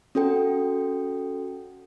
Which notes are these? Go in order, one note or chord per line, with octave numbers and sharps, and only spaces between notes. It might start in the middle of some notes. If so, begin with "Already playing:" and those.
C#4 F#4 A4 G5